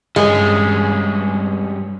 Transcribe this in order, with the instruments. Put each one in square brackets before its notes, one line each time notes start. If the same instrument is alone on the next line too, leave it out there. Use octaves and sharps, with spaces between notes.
[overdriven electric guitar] G2 C#4 [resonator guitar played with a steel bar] G#3